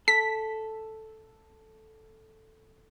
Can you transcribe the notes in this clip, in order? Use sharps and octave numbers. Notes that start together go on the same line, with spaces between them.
A4 B6